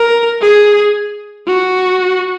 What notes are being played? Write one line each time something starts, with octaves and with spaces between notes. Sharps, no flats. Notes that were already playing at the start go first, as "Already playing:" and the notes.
Already playing: A#4
G#4
F#4